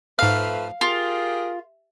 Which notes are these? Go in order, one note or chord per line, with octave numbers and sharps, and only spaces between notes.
G#2 F3 A3 B4 F5 F6
F4 G4 G#4 A#4